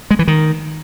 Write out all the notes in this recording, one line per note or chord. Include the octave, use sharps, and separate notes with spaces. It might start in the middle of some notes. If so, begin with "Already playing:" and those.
G#3
E3
D#3